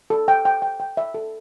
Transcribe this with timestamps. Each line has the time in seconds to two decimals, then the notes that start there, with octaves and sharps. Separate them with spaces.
0.10 A4
0.28 G5
0.45 G5
0.62 G5
0.80 G5
0.97 E5
1.14 A4